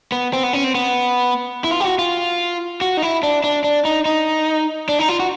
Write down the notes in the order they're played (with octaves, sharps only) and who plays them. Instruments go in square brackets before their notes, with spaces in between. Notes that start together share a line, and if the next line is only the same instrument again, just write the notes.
[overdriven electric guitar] B3
C4
B3
C#4
C4
B3
E4
F4
G4
F#4
F4
F#4
D#4
E4
D4
D4
D4
D#4
D#4
D4
D#4
F4
F#4